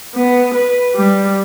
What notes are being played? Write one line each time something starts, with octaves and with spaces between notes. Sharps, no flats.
B3
B4
G3